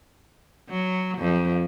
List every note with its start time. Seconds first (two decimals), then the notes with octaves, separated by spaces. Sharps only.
0.70 F#3
1.18 F2